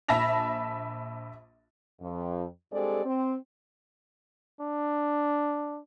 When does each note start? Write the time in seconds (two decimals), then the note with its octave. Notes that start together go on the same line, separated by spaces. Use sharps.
0.09 A#1 E5 A5 B5 A#6 F7
2.01 F2
2.72 G2 G#3 C4 G4 A4 D5
3.05 C4
4.61 D4